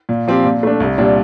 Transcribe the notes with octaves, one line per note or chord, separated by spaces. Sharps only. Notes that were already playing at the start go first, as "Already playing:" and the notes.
A#2
F3 C4 G4
A#2
A3 D4
C2
A#2 G3 D4